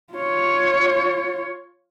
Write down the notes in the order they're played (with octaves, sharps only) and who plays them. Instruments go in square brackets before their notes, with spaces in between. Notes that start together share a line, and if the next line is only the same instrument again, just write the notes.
[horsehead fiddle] F4 C#5